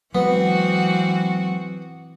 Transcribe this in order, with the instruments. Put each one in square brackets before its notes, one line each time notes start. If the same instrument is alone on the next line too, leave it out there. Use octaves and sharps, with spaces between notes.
[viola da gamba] E3 C4 F#4 [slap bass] F#3 G#3 [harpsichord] B3